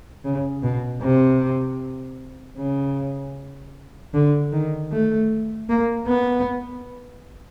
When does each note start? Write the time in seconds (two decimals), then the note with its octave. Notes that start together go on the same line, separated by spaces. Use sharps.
0.25 C#3
0.63 B2
1.02 C3
2.58 C#3
4.14 D3
4.53 D#3
4.92 A3
5.70 A#3
6.09 B3